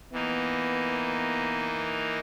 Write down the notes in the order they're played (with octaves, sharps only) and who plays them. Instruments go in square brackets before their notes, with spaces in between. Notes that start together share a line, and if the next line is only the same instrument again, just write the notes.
[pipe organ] E3 A#3 D#4 [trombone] B3